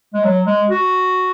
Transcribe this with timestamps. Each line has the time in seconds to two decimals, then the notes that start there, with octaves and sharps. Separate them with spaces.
0.14 G#3
0.24 F#3
0.47 G#3
0.70 F#4